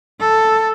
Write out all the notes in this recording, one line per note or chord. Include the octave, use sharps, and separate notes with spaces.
A4